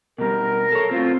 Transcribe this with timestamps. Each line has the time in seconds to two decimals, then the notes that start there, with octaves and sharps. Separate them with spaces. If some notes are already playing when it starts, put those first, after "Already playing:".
0.18 B2 G3 A#4
0.72 A4 C#5
0.91 A2 C4 F4